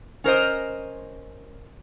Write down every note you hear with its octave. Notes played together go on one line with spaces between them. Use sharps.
C#4 A#4 C5 D#5